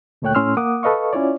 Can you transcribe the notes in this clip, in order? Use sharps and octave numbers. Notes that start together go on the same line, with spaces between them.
D2 A#2 A3 C#5 G5 F#6
A2 C#4 C6 E6 F6
A#3 F#5 D6 D#6
A4 B4 D#5 F5 C#6
C#4 E4 F4 C#5 D5